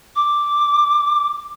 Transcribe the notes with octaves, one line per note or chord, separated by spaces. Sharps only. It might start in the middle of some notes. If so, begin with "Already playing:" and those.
D6